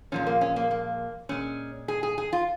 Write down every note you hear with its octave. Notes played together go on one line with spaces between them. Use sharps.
A#2 F3 G#3 C#4
A#3
C#4
A#3
A#3
A#2 G#3 C#4
G#4
G#4
G#4
F4